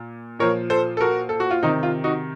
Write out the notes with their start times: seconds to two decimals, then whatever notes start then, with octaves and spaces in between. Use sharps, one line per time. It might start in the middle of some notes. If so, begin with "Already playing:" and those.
Already playing: A#2
0.39 A#2 F3 A#4 C#5
0.70 A4 C5
0.97 A4
1.01 F#4 A#4
1.29 A4
1.40 F#4
1.51 F4
1.63 C3 D#3 D#4
1.83 F4
2.04 D#4 F#4